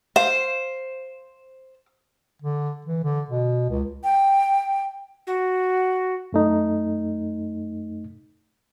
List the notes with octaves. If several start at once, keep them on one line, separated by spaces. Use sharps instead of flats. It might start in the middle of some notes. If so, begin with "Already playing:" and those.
C5 F5
D3
E3
D3
B2
C#2
G5
F#4
F#2 A3 D#4